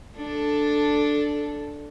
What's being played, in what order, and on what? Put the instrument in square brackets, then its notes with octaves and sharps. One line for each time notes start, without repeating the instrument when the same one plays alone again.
[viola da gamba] D4 A4